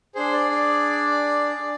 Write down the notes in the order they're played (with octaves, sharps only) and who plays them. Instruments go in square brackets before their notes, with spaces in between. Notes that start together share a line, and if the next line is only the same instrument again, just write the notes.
[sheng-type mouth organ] D4 G#4 C5
D5
D5
D4 G#4